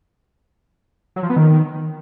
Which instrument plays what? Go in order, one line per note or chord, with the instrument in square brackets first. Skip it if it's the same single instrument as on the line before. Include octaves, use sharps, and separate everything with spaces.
[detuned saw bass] F#3
F3
B3
D#3